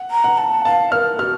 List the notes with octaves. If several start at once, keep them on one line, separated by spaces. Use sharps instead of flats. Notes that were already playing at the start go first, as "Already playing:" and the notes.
Already playing: F#5
A#5
F#5
A5
F5 A5
A#4 F6
F#4 F6